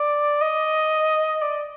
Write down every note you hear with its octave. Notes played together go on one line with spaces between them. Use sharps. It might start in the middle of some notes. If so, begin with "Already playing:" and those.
Already playing: D5
D#5
D5